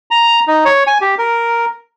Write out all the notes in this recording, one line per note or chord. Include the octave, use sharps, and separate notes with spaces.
A#5
D#4
C#5
G#5
G4
A#4